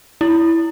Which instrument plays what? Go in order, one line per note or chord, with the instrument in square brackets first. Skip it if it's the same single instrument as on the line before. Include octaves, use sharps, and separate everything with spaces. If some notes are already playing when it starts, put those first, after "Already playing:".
[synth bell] E4